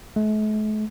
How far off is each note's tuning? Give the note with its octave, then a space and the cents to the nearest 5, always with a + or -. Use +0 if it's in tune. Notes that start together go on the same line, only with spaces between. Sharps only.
A3 -45